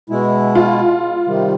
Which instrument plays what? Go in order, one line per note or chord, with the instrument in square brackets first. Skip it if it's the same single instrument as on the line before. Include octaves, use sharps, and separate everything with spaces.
[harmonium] B2 G#3 E4
[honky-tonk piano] F4
[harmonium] C3 D#3 G3